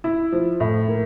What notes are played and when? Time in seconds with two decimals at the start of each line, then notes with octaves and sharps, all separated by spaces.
0.04 E4
0.32 F3
0.60 A2
0.88 A#3